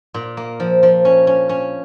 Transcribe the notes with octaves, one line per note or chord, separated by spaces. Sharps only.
A#2
A#3
F3
F3
C#4
C#4
C#4